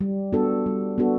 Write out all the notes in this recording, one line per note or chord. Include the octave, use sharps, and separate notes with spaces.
G3
B3 D4 F#4 A4
G3
B3 D4 F#4 A4